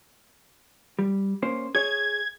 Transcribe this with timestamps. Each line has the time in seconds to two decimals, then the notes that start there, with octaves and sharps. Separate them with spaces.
0.99 G3
1.42 A#3 C#4 C5
1.75 G#4 C#5 G#6